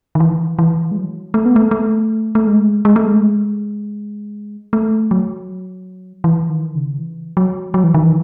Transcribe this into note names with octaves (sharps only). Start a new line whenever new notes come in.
D#3
E3
E3
G#3
F#3
A3
B3
A3
A3
A3
G#3
G#3
A3
G#3
A3
F#3
E3
D#3
C#3
E3
F#3
F#3
E3
D#3
E3